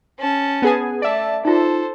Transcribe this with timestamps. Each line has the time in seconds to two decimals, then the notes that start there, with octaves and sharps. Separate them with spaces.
0.18 C#4 A5
0.62 B3 G#4 G#5
1.02 A3 D5 E5 A5
1.45 D#4 F4 A4 C5